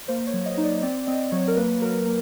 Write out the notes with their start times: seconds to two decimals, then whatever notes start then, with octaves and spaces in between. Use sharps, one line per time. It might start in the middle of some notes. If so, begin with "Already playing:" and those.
0.08 A#3 C5
0.27 C#5
0.34 F#3
0.46 D#5
0.57 D#4
0.64 D5
0.82 C4 D5
1.07 C4 D#5
1.32 F#3 C#5
1.48 A#4
1.56 A#3 B4
1.82 F#3 A#4
2.06 A#3